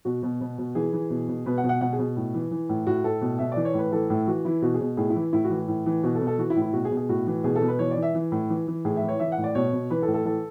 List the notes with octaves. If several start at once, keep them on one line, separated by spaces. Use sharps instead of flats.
B2 F#4
B2
B2
B2
E3 G#4
E3
B2
B2
B2 B4
F#5
B2
F#5
B2 F#5
G#4
B2
A2
E3
E3
A2
A2 F#4
A2 A4
B2
B2 E5
E3 D5
C#5
A2 B4
E3 A4
A2
E3 F#4
E3 E4
B2 F#4
G#4
B2
A2 G#4
E4
E3
A2 E4
F#4
E3
A2
E3
B2 F#4
A4
B2
A4
E3 F#4
E4
A2
E4
B2 F#4
G#4
B2
G#4
A2 F#4
E3
B2 G#4
A4
B2
B4
E3 C#5
D5
E3
E5
E3
A2
E3
E3
A2 G#4
E5
E3
C#5
E3 E5
F#5
A2
D5
B2 C#5
B2
E3 B4
A4
A2
A4
E3 A4